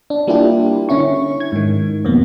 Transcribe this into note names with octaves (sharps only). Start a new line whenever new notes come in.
D4
G3 A#3 D4 E4 F4 G4
D3 C#4 E4 C#6
G#6
G#2 D#3
F2 B2 A#3